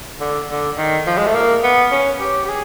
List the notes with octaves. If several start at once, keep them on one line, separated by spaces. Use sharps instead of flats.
D3
D3
D#3
F3
G#3
A3
A#3
B3
C#4
G4
G4
G#4